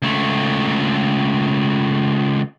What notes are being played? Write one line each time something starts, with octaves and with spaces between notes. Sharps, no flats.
C#2 A3